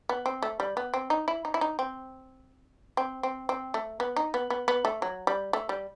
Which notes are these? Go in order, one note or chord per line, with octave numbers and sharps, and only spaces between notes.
B3
C4
A3
G3
B3
C4
D#4
E4
D#4
E4
D#4
C4
C4
C4
C4
A3
B3
D#4
B3
B3
B3
A3
F#3
G3
A3
G3